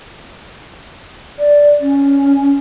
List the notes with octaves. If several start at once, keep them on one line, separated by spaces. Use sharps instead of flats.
D5
C#4